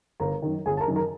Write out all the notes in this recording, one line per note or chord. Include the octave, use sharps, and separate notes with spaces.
G1 A#4 A#5
F#2 D#3
G1 G#4 G#5
A5
A#4 A#5
F#2 D#3
A#4 A#5